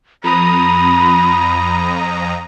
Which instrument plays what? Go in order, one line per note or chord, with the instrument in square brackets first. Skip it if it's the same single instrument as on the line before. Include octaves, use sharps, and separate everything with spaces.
[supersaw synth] F2 A#5 D#6 [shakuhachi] B5